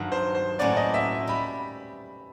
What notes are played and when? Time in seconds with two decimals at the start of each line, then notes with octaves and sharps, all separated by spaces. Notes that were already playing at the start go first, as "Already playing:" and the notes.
Already playing: G2 D#3 F#3
0.12 C5
0.35 C5
0.59 A2 F#3 A#3 C#4 F#4 D5
0.77 D#5
0.94 E5
1.27 G3 B5